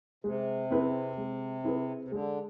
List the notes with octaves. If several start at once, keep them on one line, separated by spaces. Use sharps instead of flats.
C3 G#3
C4 E4 G#4 B4
G#3
C4 E4 G#4 B4
C3
D3 G#3